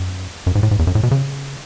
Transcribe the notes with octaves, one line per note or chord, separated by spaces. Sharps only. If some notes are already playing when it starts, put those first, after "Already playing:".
Already playing: F#2
F#2
G#2
A2
G#2
E2
F#2
A2
B2
C#3